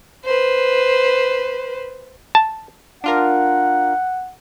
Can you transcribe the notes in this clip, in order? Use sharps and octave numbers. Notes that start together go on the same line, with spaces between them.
B4 C5
A5
D4 F4 A#4 F#5